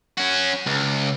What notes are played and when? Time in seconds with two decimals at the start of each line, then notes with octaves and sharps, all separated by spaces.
0.18 C#4 F#4
0.66 C#2